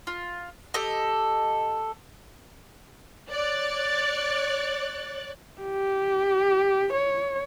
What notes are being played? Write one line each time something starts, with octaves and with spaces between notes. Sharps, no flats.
F4
G4 A4 D#5
C#5 D5 F#6 A6
G4
C#5